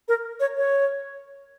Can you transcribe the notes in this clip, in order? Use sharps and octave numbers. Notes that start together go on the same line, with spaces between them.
A#4
C#5
C#5